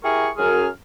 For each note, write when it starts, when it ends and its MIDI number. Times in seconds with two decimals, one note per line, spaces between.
0.03 0.28 64
0.03 0.28 67
0.03 0.28 68
0.03 0.28 70
0.03 0.28 85
0.37 0.67 42
0.37 0.67 68
0.37 0.67 89